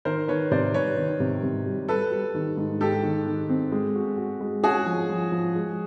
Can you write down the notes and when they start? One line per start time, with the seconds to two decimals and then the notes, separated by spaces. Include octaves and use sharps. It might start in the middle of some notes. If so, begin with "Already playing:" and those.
0.05 D#3 A#4 C5
0.28 D#3 B4 C#5
0.51 C3 C5 D5
0.74 C3 B4 C#5
0.97 D#3
1.20 C3
1.43 C3
1.66 G3
1.88 G3 A4 B4
2.11 G3
2.34 D#3
2.57 G#2
2.80 G#2 G4 A4
3.03 D#3
3.26 D#3
3.49 C4
3.72 G#3
3.95 F#4
4.17 F#4
4.41 G#3
4.63 C#4 F#4 G#4
4.86 F3
5.09 F3
5.32 F3
5.56 G#3